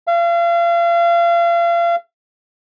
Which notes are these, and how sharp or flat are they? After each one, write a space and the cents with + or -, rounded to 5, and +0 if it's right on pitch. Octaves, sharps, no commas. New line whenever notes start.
F5 -35